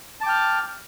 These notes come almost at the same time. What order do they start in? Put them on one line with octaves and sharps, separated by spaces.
A5 D6 G5 F6